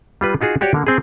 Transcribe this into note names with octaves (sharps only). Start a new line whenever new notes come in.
G3 F4 B4
D#4 F4 F#4 G#4
F#4 G4 C#5 D5
D3 A#3
C4 G#4